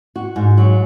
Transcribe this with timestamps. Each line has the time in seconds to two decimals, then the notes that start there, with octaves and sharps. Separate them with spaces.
0.16 F#4
0.36 G#2
0.58 F#3